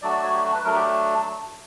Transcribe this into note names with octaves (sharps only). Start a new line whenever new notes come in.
F#3 A3 D4 F#4 D5
D5
C#5
G4
F#4
B4
F#3 A3 D4 A#4
G4